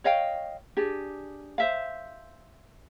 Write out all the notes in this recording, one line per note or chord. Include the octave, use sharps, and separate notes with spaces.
C#5 D#5 F5 G5
D4 G4 G#4
C5 E5 F5